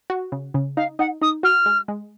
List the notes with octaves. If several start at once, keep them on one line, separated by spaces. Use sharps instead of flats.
F#4
C#3
C#3
D#4 F5
D#4 F#5
D#4 D#6
F#4 F6
G#3
G#3